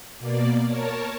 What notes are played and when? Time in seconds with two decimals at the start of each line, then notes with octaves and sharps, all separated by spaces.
0.19 B2 A#3 D5
0.63 A#4 C#5 A5